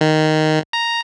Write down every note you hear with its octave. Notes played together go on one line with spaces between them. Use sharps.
D#3
A#5